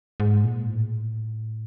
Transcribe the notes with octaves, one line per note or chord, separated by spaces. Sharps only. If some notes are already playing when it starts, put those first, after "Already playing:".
G#2
A#2
A2